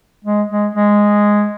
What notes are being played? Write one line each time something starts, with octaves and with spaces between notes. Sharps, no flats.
G#3
G#3
G#3